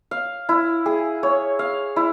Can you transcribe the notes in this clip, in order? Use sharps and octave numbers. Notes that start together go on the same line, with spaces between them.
F5
E4
G#4
C#5
F5
E4